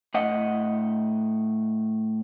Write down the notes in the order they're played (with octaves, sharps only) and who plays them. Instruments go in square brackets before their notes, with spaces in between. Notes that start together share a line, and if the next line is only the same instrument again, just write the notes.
[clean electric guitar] A2 D#5 F#5